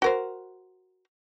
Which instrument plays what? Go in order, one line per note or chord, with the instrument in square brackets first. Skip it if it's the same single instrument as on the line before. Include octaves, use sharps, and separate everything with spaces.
[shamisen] F#4 A#4 C5